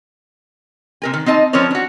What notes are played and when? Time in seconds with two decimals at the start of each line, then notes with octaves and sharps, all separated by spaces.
1.02 C3 A#4 G#5
1.14 D#3
1.26 C4 D#4 D#5 A5
1.53 F3 C4 C#4 A#4 C#5 D5
1.71 D4 F#4